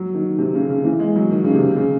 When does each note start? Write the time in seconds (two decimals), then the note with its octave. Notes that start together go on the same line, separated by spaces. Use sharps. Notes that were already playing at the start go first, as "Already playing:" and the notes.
Already playing: F#3
0.14 D#3
0.38 C3
0.54 C#3
0.69 C#3
0.84 E3
0.99 G#3
1.16 F#3
1.31 D#3
1.44 C#3
1.54 C3
1.76 C#3